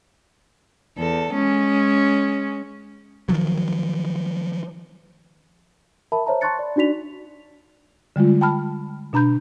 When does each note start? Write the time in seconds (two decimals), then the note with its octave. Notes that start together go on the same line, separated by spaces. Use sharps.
0.97 E2 A4
1.33 G#3 C#4
3.29 D#3 F3 F#3
6.12 A#4 E5 A5 B5
6.26 C5 C#5 E5 A5 A#5
6.41 A5 C6 C#6 F#6 A6 C#7
6.59 D5 B5
6.76 D4 D#4 F#4 D5 B6 F7
8.16 D3 G3 G#3 F4
8.41 G5 A5 B5 F6
9.13 B2 D4 A#5 B5 G6